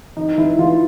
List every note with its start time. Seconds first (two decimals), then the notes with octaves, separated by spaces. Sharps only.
0.17 E3 D#4
0.38 E3 E4
0.59 E3 F4